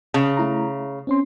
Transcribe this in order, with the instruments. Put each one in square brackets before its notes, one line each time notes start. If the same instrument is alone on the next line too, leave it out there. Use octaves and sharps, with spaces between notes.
[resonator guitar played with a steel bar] C#3 [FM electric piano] A5
[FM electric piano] A3 E4 A#5
C4 C#4 C6